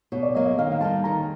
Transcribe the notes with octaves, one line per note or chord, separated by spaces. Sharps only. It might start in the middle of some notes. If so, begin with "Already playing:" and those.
B2 C#5
D5
F#3 A#3 D#5
D#5
D#3 F5
G3 A#3 D#4 A5
D#3 A#5